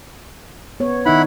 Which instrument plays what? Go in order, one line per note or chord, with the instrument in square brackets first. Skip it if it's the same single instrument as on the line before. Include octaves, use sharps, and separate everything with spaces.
[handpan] B3 C#5
[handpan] D#3 D#4 [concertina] E4 F#5 B5